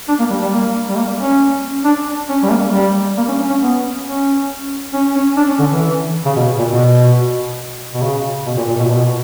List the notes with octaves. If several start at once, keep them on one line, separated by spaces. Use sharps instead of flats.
D4
A#3
G3
G3
A#3
G3
A#3
C#4
D4
C#4
G3
A#3
G3
A#3
C#4
C#4
C#4
B3
C#4
C#4
C#4
D4
C#4
D3
E3
C#3
B2
A#2
B2
B2
C#3
B2
A#2
A#2
B2
A#2
B2